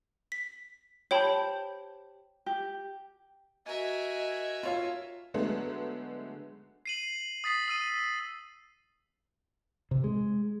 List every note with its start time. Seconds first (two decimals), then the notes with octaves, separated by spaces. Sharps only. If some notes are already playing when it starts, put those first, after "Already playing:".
0.32 B6
1.11 G4 C5 C#5 G5 A5 B5
2.46 G4
3.66 F#4 A#4 D#5 E5 G#5
4.63 F4 C#5 F5
5.34 D3 F#3 G#3 A3 B3
6.86 C7 D#7 F#7
7.44 D#6 A6 B6 C7
7.68 D#6 E6 D#7
9.91 C3
10.04 G#3